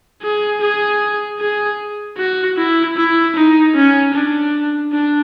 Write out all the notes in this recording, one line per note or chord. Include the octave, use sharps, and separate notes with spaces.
G#4
G#4
G#4
F#4
E4
E4
D#4
C#4
D4
D4